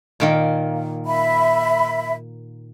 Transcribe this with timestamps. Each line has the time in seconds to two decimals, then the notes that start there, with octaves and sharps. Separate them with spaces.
0.20 A#2 D#3 A#3
1.06 E5 B5